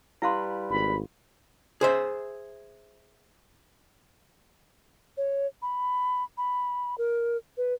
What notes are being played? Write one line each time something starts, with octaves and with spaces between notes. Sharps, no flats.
G3 E4 B4 F5 C6
G#1 B5
G#4 C5 E5
C#5
B5
B5
A#4
B4